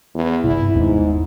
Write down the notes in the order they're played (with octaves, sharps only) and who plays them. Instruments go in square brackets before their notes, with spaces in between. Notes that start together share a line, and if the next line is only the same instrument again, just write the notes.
[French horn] E2
[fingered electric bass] G#1 G2 C3 [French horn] E4
[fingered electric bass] F#1 D#2 B3 [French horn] G#2